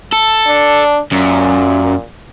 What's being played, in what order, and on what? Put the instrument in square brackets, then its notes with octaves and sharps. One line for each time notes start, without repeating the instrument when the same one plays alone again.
[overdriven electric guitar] A4
[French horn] D4
[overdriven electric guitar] F#2 [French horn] A#2